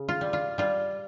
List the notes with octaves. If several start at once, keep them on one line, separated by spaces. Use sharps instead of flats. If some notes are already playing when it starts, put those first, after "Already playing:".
Already playing: C#3
F4
G3
F4
G3 F4